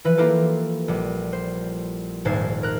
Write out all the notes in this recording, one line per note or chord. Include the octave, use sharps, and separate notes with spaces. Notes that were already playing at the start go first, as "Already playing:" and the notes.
E3 F3 B4
A#3 E4 F4 G4 A4
A#1 G3
C5
D#1 G#1 C5 G#6 A6 C7
A#4 F#6